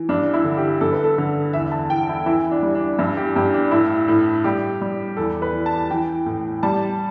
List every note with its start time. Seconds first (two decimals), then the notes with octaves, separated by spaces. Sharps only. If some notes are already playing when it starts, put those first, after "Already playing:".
Already playing: E3
0.09 G2 D4
0.34 E4
0.44 D3
0.57 G4
0.81 G2 A4
0.92 B4
1.04 A4
1.18 D3
1.53 E2 E5
1.72 A5
1.90 E2 G5
2.09 E4
2.26 E3 E4
2.51 D4
2.63 G3
2.75 D4
2.99 G2 E4
3.17 G4
3.36 G2 G4
3.54 D4
3.71 A2 E4
4.08 A2
4.44 G3 G4
4.82 G3
5.17 E2 A4
5.42 B4
5.53 E3
5.66 A5
5.90 E3 G5
6.26 A2
6.63 G3 A5